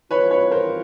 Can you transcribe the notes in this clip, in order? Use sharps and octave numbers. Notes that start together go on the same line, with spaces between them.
E3 G3 C4 F4 B4 C#5
B4 C#5
A#4 C5